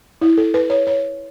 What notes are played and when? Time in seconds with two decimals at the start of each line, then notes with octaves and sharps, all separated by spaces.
0.21 E4
0.37 A4
0.54 B4
0.70 C#5
0.87 C#5